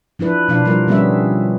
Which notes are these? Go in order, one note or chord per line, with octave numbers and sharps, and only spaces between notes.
F3 D4 E4 B4
B2 F3 D4 F4 F5
F3 G3 D4 A#4
D3 G3 B3 C#4 G#4 E5